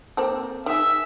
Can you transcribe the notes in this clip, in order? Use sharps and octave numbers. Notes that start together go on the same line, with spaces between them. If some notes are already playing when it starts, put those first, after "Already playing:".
A#3 C4 A4
D#3 G#4 E5